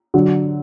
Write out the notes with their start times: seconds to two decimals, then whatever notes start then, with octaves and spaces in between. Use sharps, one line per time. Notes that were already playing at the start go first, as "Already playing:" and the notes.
0.14 D3 F#3